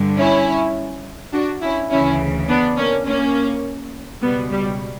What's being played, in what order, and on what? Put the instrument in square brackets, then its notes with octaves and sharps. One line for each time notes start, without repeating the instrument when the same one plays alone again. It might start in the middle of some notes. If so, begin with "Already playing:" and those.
Already playing: [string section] G2 D3
C#4 E4
D4 F#4
C#4 E4
D2 C#3 E3 C#4 E4
B3 D4
A#3 C#4
A#3 C#4
C#2 B2 G3 B3
G3